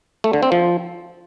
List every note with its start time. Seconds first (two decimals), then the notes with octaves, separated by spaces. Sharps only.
0.24 A3
0.33 D3
0.43 C4
0.52 F3